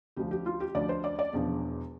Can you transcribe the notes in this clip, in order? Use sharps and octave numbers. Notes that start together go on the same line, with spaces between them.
D2 D3 F3 G4
G4
F4
G4
D2 D3 F3 D5
C5
D5
D5
E1 E2 D3 F3